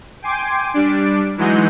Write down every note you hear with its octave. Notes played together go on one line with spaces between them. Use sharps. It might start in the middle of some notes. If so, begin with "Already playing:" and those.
G5 G#5 C6 D6
G3 D4 D6 D7
E3 F#3 G#3 D#4 F#5 G6